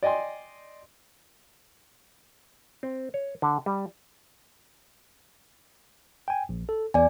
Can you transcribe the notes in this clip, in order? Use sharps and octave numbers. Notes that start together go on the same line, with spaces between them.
D5 D#5 G5 G#5 C6
C4
C#5
D3
G3
G5 G#5
A#1
A4
E2 D5 G#5